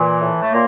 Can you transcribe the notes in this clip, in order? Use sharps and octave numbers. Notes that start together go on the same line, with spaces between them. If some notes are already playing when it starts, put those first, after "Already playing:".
Already playing: A#2 E3
A2
A3
A#2 A#3